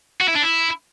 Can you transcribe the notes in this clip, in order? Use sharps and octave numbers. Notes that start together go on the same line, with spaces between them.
F#4
E4
D4
E4